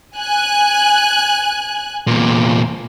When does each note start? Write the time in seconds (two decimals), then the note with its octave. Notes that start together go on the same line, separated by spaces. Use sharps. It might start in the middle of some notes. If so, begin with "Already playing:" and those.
0.18 G#5 F#6
2.07 E2 A#2